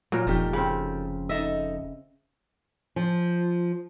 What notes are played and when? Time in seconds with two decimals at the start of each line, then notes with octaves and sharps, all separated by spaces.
0.12 A#2 F#3 A#4
0.27 F1 A3 D#4 G4
0.53 C#3 C4
1.29 D#4 A4 D#5 E5
2.96 F3